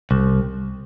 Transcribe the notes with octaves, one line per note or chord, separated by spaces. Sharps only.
C2